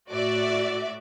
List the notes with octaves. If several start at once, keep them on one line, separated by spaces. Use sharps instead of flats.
A2 F#4 D5 E5